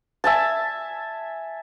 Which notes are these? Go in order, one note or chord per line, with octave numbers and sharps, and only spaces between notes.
E5 G#5 A5